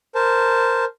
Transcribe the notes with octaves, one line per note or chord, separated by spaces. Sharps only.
A#4 C5 A5